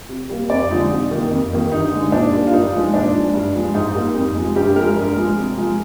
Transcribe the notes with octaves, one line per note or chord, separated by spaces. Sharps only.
C3
G3 A#3
F2 D5
D3 F3 G#3 D#4
C3
D#3 A#3
F2
D#3 G3 A#3
G2 D#4
D3 G#3
A#2 D4
G3 A#3
F4
G2 D#4
F3 G#3
A#2 D4
F3 G#3
G2
F3 G#3
G#2 D#4
G3 A#3
F2
C3 F3 G#3
G2 G4
F3 G#3 A#4
G2
F3 G#3
C3
F3 G#3